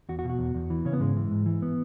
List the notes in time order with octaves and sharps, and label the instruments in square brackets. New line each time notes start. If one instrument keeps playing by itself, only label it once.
[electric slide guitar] E2 F#4
F#4
B2
F#4
E2
E2
E3
C#3 C#4
B3
G#2 G#3
E3
G#2
E3
B3